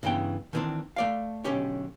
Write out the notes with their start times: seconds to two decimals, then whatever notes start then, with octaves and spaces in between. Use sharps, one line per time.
0.03 G2 C#3 E3 B3 G5
0.53 D#3 E3 A3 B3 C4 D4
0.96 A3 D5 F5
1.44 B1 B2 D3 C#4 G4 C#5